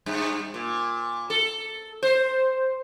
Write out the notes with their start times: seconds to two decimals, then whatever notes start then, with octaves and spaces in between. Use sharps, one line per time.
0.06 G2
0.54 A#2
1.30 A4
2.03 C5